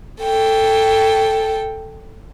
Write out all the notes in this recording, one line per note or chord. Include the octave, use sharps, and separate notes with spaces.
A4 G5